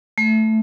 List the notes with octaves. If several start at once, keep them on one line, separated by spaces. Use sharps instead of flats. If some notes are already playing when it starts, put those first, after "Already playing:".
A3